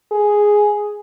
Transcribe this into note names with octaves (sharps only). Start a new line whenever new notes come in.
G#4